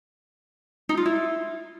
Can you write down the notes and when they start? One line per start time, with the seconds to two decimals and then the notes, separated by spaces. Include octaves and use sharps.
0.89 D#4
0.97 F4
1.06 E4